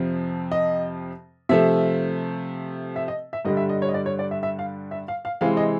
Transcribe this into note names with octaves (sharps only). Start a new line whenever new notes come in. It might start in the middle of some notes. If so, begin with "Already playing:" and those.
Already playing: F2 C3 F3
D#5
C3 F3 A3 E5
E5
D#5
E5
G2 D3 G3 D#5
E5
D#5
C#5
D#5
D5
C#5
D5
E5
E5
F5
E5
F5
F5
C3 E3 G#3 C4 F5
D#5